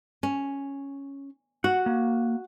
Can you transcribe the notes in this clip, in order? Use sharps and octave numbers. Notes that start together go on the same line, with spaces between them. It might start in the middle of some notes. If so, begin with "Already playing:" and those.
C#4
F#4 F#5
A#3